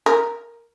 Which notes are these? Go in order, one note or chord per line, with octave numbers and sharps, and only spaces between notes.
A#4